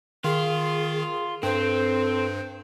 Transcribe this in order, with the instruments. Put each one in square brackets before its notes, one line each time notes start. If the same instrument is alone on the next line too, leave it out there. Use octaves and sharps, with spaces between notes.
[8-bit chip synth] D#3 [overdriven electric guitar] F4 [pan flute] G#4
[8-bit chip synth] G2 [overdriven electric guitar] C4 [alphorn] A4 [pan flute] C5